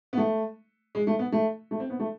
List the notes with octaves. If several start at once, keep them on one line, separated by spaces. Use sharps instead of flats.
B3
A3
G#3
A3
B3
A3
A3
C4
B3
A3